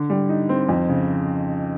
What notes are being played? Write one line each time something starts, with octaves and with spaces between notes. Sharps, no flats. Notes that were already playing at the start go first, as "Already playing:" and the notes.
Already playing: D3
G3
D#4
C4
F2
C#3